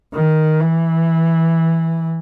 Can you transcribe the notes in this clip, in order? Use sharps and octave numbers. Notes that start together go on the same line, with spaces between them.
D#3
E3